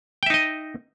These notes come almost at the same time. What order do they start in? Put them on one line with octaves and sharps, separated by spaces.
G5 E5 D#4 D#5